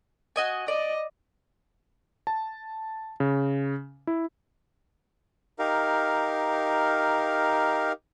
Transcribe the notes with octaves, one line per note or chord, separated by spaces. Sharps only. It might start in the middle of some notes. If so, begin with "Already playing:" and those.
F#4 D#5 G#5
D5 D#5
A5
C#3
E4
D#4 G4 A#4 F5